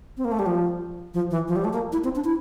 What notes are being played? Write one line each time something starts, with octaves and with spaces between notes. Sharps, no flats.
C4
A#3
A3
G3
F3
F3
E3
F3
G3
A3
A#3
E4
C4
D4
E4